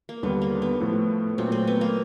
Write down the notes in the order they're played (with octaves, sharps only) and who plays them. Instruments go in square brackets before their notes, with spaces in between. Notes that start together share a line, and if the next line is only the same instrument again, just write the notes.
[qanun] A#3
[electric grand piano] D#2 D3 G3 [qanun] B3
[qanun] A#3
B3
[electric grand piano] A2 F3 A3
[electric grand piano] A#2 F#3 A3 [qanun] C4
[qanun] C4
B3
A#3